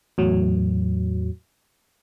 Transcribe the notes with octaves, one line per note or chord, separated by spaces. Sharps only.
E2 A2 F#3